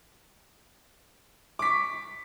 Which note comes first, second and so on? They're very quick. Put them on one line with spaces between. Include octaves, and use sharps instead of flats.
D6 B6 C#6